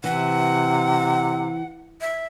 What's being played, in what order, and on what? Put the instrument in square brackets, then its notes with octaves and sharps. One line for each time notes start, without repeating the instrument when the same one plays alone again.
[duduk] C3 [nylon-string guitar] E3 [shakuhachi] F#5
[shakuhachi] E5